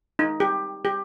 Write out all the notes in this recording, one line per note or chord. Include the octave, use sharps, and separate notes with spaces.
D#4
G4
G4